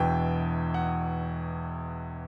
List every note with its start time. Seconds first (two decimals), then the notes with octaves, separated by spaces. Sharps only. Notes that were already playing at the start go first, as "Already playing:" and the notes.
Already playing: E1 E2 B2 G5
0.74 F#5